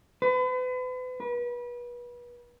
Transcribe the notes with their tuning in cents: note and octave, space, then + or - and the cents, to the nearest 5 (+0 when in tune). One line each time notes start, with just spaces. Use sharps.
B4 +40
B4 -30